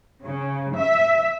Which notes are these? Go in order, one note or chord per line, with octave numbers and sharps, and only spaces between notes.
C#3
E5